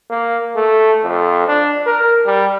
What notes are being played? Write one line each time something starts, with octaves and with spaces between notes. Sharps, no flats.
A#3
A3
F2
D4
A#4
G3